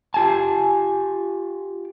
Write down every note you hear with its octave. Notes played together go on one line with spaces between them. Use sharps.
F4 G4 G#5 A5